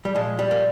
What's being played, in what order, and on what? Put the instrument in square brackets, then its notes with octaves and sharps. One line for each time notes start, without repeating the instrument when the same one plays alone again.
[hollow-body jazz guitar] G3
A#2 F3 G#3
G3
A#3